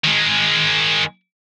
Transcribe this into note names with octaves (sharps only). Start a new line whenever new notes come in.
D#3 G#3